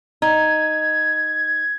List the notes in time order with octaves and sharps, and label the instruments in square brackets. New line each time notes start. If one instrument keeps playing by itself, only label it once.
[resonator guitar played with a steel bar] D#4 [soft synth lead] G#6